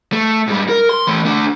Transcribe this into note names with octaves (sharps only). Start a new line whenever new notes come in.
A3
G#2 G3
A#4
C6
E3 A3
A3 D4